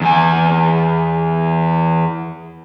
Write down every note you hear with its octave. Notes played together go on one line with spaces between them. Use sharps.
E2 G#5